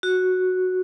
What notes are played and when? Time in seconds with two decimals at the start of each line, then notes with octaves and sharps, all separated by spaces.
0.03 F#4